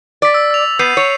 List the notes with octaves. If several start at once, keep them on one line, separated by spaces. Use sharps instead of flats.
D5 A6 B6
E6
E6 F7
B3 G6 C7 D#7
C#5